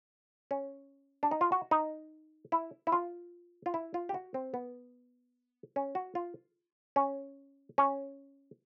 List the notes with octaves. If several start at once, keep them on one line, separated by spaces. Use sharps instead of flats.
C#4
D4
D#4
F4
F#4
D#4
E4
E4
F4
F4
E4
F4
G4
F#4
C4
B3
C#4
F#4
F4
C#4
C#4